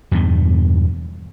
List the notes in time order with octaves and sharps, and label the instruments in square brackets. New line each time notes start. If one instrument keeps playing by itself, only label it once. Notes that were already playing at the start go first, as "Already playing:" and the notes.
[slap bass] E2 G2 B2 D#3